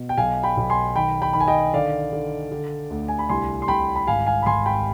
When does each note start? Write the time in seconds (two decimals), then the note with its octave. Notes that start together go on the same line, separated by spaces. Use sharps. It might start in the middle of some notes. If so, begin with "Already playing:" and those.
Already playing: B2
0.09 G5
0.18 B1 F5 G#5
0.43 G5 B5
0.57 B1
0.70 G#5 C6
0.96 D#3 G5 B5
1.22 G5 B5
1.33 D#3 B5
1.40 G#5
1.48 D#5 G5
1.73 D3 D5 F5
2.13 D3
2.52 D3
2.90 D2
3.08 G#5
3.19 B5
3.29 C2 G#5 C6
3.62 C6
3.68 C2 G5 B5
3.96 B5
4.07 G#1 F5 G#5
4.27 F5 G#5
4.42 B5
4.46 G#1 G#5 C6
4.66 G5 B5